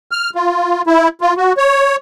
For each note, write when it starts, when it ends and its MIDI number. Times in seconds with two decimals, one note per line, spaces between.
0.11 0.30 89
0.35 0.82 65
0.87 1.08 64
1.21 1.34 65
1.37 1.53 66
1.57 1.96 73